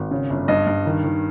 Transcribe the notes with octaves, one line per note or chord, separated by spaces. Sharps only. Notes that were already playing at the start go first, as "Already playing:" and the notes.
Already playing: G#1
C#3
G1
G2 D#5
G2
D#3
D#3